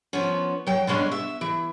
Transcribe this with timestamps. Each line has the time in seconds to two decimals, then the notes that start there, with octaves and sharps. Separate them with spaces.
0.13 F3 B3 C#4
0.67 F#3 G5
0.87 B2 G#3 C#4 D4
1.11 E5
1.41 E3